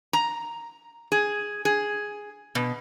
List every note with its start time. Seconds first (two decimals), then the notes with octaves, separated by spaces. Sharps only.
0.13 A#5
1.12 G#4
1.65 G#4
2.55 B2